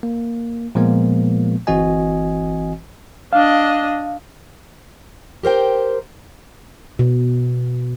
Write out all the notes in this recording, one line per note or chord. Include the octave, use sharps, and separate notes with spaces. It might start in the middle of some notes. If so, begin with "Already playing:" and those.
A#3
A#2 F3 G#3 A#3 B3
G1 E3 C4 F#4 D#5 G#5
D4 D#5 F5
G4 A#4 C5 G5
B2